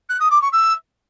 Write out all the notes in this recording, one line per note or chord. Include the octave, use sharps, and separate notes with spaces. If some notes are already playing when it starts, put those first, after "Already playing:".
F#6
D#6
D6
C#6
E6